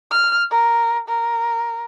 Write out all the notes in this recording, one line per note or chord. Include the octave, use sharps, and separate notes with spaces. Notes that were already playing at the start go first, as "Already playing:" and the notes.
F6
A#4
A#4